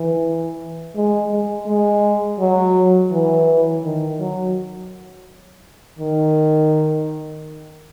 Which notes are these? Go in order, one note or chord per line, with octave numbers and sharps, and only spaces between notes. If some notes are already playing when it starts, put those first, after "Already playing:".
Already playing: E3
G#3
G#3
G#3
F#3
E3
D#3
F#3
D#3